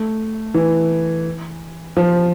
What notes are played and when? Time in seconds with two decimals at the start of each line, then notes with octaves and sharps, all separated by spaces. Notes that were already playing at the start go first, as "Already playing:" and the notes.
Already playing: A3
0.54 E3
1.97 F3